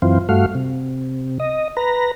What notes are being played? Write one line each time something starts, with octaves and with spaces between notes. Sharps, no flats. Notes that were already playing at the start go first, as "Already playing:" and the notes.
F#2 E3 C4 F4
G2 A3 F#4 F5
C3
D#5
B4 A#5